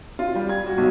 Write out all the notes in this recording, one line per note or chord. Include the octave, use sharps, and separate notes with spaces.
F4
G3
G#6
F#4
B1